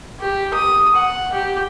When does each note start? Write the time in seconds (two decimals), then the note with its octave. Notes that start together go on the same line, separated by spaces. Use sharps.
0.20 G4
0.54 D#6
0.96 F#5
1.33 G4